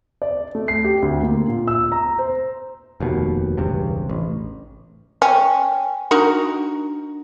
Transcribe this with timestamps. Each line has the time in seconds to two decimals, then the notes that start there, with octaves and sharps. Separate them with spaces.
0.22 D5
0.55 A3
0.68 C7
0.84 G4
1.02 D2
1.23 A#3
1.48 A#2
1.68 E6
1.92 A#5
2.19 C5
3.00 F1 D#2 B2
3.58 E1 C#2 G2 C3
4.10 A1
5.22 C#4 G5 G#5
6.11 D4 D#4 F#4 A#4